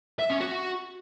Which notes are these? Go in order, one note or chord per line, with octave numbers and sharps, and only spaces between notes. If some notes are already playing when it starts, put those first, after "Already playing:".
E5
C#4
F#4